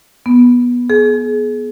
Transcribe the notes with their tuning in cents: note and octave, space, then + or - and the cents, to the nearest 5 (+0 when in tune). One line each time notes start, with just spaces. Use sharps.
B3 -15
G#4 +30